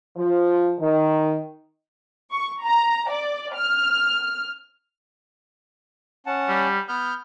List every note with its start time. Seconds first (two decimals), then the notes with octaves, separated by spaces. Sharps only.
0.16 F3
0.78 D#3
2.31 C#6
2.63 A#5
3.10 D5
3.56 F6
6.26 C#4 F#5 A5
6.48 G3
6.88 B3 F6 G6